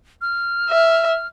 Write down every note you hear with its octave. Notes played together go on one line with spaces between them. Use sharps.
F6
E5